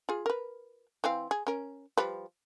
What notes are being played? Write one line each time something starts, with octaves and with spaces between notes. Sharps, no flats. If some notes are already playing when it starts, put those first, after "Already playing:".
F4 G#4
A#4 B4
E3 C4 F5
G#4
C#4 A#4
F3 G3 B4